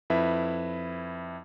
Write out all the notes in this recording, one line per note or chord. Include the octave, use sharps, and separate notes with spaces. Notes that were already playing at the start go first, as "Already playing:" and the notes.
F2 E4 B4 E5